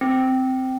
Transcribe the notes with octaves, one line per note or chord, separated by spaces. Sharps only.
C4